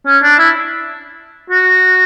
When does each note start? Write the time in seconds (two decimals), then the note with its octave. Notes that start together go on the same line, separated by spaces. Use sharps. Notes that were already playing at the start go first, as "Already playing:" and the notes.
0.06 C#4
0.23 D4
0.39 E4
1.50 F#4